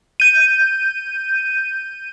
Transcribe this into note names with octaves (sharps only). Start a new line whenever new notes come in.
G6 D#7